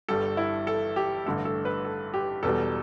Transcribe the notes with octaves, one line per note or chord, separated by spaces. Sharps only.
G1 G2 G3 A4
E4
A4
G4
A1 G2 D3 A3 A4
A4
B4
A4
G4
E1 E2 B2 G3 A4